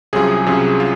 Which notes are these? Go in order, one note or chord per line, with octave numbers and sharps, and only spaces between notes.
C2 C3 F#3 C#4 F4 G#4
C2 C3 F#3 C#4 F4
F4